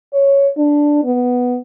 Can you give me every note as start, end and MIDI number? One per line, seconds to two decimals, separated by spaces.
0.13 0.48 73
0.57 1.00 62
1.04 1.57 59